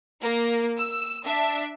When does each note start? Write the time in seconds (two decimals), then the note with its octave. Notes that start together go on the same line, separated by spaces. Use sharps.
0.22 A#3
0.78 E6
1.25 D4 E5